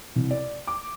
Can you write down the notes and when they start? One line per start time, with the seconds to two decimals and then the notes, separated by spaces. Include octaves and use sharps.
0.16 C2
0.31 D5
0.67 D6